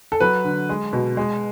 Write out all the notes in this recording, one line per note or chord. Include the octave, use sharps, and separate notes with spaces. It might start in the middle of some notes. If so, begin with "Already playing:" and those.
A4
F#3 B4
D3
G#3
B2
G#3